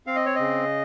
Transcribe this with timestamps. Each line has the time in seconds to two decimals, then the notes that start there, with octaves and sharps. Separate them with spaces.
0.06 C4 F5
0.16 D#5
0.26 C#5
0.35 C#3 D#5